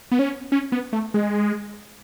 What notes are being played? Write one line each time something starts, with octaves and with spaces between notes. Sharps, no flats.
B3
C#4
C#4
B3
A3
G#3